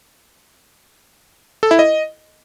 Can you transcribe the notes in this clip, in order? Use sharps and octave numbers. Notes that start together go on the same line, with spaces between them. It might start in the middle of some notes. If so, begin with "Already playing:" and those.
A4
E4
D#5